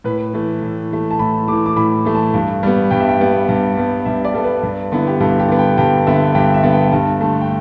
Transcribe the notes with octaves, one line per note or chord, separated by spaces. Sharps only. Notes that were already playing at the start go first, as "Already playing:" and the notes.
A2 B4
E3 A3
A2
E3 A3
A5
A2 B5
E3 A3 D6
D6
A2 B5
E3 A3
A5
G2
G3 B3
G2 G5
E5
G5
G3 B3
G2
G3 B3
G2 E5
D5
G3 B3 A4
B4
G2
D3 B3 E4
G4
G2 A4
G4
D3 B3
G5
G2 G5
D3 B3 E5
G2 G5
E5
D3 B3
G5
G2 A5
D3 A3 A5
G5